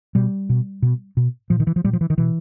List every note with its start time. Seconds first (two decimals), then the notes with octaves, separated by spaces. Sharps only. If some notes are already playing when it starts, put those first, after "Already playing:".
0.15 B2 G3
0.49 B2
0.82 B2
1.17 B2
1.50 A#2 F3
1.60 D#3
1.67 E3
1.76 F3
1.84 A#2 G3
1.93 F3
2.01 E3
2.10 D#3
2.18 B2 E3